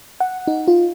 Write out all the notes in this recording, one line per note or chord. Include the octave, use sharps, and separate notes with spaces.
F#5
D#4
F4